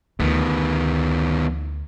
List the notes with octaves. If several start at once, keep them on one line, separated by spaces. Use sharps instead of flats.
D2 D#3 B3 F4